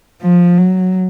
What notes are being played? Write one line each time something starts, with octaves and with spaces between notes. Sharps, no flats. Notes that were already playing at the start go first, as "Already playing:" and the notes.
F3
F#3